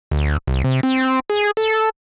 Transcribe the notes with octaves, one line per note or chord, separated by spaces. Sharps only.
D2
C2
C3
C4
G#4
A4